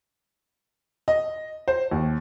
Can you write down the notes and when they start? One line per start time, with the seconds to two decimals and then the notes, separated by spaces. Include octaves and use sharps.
1.08 D#5
1.68 C5
1.91 D#2